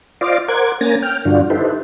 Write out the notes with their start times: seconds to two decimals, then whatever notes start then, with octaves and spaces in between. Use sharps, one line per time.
0.21 F4 C5 D5 D#5 F5 D6
0.48 A#4 C5 F#5 D6 G#6
0.81 A#3 C#4 G#5 A#5 A6 A#6
1.03 G5 F6
1.25 G2 D3 D4 F4 F#4
1.50 D#4 E4 G4 A4 B4 C5